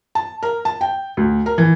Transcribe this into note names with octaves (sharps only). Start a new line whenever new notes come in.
A5
A#4
A5
G5
D2
A#4
E3